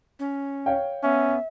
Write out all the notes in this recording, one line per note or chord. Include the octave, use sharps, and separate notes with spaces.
C#4
C#5 F5 G5
B3 C#4 E5